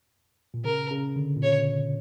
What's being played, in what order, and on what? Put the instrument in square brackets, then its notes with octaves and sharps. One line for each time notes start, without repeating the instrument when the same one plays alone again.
[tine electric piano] A#2
[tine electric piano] C#3 [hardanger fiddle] A#4
[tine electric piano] C#3
D3
A#2
[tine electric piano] C#3 [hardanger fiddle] C#5